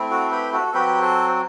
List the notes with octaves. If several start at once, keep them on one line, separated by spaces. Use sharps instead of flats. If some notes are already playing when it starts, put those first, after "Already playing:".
Already playing: A3 C4 E4
F#4 A4
G4 B4
F#4 A4
F#3 C4 F#4 G4 B4
A4 C5